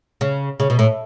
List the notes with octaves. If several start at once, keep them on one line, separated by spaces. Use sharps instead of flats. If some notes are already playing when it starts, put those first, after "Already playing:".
C#3
C#3
B2
A2